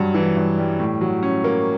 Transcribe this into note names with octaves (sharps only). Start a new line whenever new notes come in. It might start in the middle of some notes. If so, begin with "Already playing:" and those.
Already playing: G2 F#3
E3
G2
G3
A2
F#3
C#4
A#3